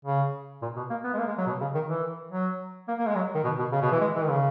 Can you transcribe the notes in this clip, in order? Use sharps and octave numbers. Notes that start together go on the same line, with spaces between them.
C#3
A#2
B2
A#3
B3
G#3
A#3
G#3
F#3
B2
C#3
D#3
E3
F#3
A#3
A#3
G#3
F#3
D#3
B2
B2
C#3
B2
E3
G#3
E3
D#3
C#3